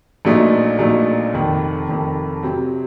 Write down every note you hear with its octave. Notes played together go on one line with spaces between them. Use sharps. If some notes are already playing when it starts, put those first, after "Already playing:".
A#1 A#2 F#3 A3 D#4
A#1 A#2 F#3 A3 D#4
F1 F2 D#3
F1 F2 D#3
C3 F#3 C4